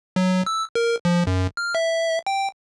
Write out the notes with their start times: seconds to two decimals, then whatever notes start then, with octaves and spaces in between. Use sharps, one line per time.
0.16 F#3
0.46 E6
0.75 A#4
1.05 F3
1.27 F#2
1.57 F6
1.75 E5
2.27 G5